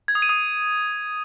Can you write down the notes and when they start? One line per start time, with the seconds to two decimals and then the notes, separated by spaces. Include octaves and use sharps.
0.08 G#6
0.15 D#6
0.22 D#7
0.29 D#6